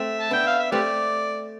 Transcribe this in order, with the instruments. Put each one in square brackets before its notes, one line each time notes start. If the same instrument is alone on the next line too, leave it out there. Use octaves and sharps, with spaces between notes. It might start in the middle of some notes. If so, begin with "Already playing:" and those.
Already playing: [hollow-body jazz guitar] A3 C4 [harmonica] E5
[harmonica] A5
[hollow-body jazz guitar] B3 D4 [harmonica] G5
[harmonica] F5
E5
[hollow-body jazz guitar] A3 C4 [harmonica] G4 B4 D5